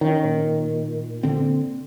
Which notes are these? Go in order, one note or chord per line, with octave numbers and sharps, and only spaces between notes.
D#3 C#4
A#2
D3 C4